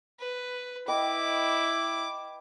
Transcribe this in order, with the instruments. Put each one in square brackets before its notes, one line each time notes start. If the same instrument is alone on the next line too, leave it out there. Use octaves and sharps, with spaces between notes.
[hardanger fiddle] B4
[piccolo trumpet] E4 [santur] B4 D#5 G5 [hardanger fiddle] D6